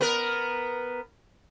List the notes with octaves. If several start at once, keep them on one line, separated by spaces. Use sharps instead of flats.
B3 A#4